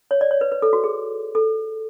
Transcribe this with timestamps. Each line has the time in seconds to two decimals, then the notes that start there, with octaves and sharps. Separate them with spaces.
0.11 C#5
0.21 D5
0.31 C#5
0.41 B4
0.52 B4
0.62 A4
0.73 F#4
0.84 G#4
1.35 A4